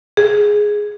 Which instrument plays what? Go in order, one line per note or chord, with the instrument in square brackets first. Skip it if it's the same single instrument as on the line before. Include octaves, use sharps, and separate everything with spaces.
[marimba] G#4